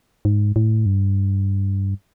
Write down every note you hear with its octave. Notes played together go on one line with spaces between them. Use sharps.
G#2
A2
G2